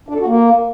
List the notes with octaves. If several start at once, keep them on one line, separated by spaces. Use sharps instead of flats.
D4
A4
F#4
A#3